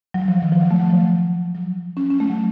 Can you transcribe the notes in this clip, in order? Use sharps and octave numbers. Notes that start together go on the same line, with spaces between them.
F#3
F3
D#3
F3
F#3
A3
F#3
F3
F#3
C#4
C#4
A3
F#3